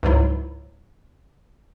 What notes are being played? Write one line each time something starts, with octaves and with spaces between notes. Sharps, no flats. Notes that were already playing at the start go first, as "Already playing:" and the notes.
C#2 G#2 F#3 E4